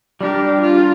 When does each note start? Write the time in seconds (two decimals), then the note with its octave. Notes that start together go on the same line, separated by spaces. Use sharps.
0.21 G3 D4 G4 A#4
0.62 F4